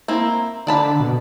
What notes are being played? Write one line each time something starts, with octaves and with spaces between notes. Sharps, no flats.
A#3 C4 E4
D3 D5 A5 B5
B2